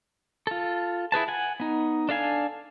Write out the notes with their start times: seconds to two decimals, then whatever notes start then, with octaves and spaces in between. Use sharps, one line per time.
0.47 F4 A4
1.12 E4 G#4 B4 A5
1.28 F#5 G#5
1.60 B3 D#4
2.09 D4 A4 F5 G#5